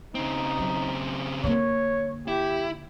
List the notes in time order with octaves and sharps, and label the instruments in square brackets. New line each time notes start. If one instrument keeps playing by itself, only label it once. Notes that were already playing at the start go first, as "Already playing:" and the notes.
[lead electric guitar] C#3 C4 [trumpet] D#4
[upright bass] F#3
[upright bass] D3 A#3 [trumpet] C#5
[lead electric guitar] E4 [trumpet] G4